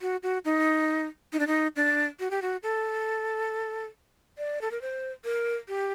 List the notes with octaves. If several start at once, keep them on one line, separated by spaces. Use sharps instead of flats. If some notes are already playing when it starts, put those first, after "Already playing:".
F#4
F#4
D#4
D#4
D4
D#4
D4
F#4
G4
F#4
A4
D5
A4
A#4
C5
A#4
G4